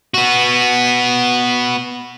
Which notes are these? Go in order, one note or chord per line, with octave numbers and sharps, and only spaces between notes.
B3 F#4